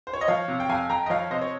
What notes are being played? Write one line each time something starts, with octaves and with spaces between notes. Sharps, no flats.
C5
C#5
D#5
F3 C#5 F5
C3
G5
F2 F5 G#5
F2 G5 A#5
D#5
F3 C#5 F5
C3 C5 D#5
C#5